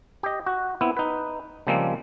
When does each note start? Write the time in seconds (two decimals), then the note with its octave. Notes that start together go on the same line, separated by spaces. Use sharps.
0.23 G4 D#5
0.47 F#4
0.81 B3 C4 E4
0.97 D#4 B4
1.67 C#3 F3 G3 G#3 A#3 C4